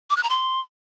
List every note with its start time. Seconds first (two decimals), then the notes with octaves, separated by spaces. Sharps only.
0.10 D6
0.17 F#6
0.23 A#5
0.30 C6